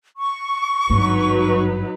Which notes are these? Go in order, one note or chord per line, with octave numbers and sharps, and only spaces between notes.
C#6
G#1 G2 F#3 D#4 B4